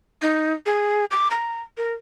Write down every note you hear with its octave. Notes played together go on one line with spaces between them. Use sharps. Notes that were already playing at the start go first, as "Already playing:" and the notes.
D#4
G#4
D6
A#5
A#4